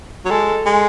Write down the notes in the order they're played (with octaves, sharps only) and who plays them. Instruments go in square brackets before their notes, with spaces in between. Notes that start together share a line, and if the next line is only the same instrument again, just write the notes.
[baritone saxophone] F#3
[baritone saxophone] G#3 [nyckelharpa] A4
[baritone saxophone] G#3